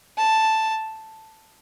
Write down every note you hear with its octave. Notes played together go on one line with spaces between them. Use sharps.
A5